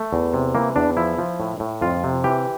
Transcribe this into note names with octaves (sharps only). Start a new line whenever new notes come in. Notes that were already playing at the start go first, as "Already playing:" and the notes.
Already playing: A3
E2
C3
E3 A#3
E2 D4
F3 E4
F3
A2
A2
F2 F4
C3
E3 G4